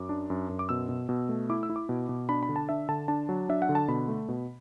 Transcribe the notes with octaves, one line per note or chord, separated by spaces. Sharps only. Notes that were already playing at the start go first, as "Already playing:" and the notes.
Already playing: F#2 D6
D4
F#2
F#2
D6
B2 E6
B2
B2
A3
E4 D6
E6
E4
D6
B2
B2
D4 B5
B5
D3
A5
D4 E5
D3 A5
D4 A5
F#3
D4 E5
F#5
D3
A5
B2 B5
A3
B2